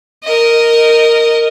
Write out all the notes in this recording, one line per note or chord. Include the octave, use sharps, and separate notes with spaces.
A#4 D#5